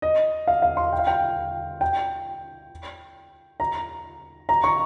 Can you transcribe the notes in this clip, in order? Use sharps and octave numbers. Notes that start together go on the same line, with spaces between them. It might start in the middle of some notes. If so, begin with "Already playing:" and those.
D#5
F5
F5
C6
G5
F5
G5
G5
A#5
A#5
C#6